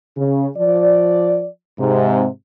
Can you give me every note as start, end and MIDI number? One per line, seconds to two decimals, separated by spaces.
0.17 0.47 49
0.57 1.47 53
0.57 1.47 74
1.79 2.25 44
1.79 2.25 48